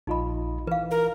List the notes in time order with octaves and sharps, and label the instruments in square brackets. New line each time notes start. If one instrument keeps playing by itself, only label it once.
[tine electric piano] A#1 F4 D#5 [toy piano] D#4 B5
[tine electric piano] E3 [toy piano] B4 F5
[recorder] A#4